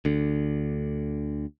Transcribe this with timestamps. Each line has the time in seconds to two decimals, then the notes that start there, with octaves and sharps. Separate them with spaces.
0.05 D2 D3